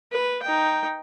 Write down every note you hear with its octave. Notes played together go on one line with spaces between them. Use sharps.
B4
D#4 G5